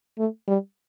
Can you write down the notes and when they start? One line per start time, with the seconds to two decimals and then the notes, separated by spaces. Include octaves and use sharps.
0.18 A3
0.48 G3